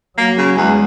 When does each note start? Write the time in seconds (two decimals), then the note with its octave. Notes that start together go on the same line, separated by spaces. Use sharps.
0.18 F#3 A#3
0.38 C#3
0.56 E2 G#3